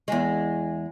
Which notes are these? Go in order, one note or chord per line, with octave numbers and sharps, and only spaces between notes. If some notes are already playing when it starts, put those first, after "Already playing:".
E2 G#3